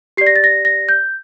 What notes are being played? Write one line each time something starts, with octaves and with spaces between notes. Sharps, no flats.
G4 D5 C7
A#6
A6
A#6
A#6
G6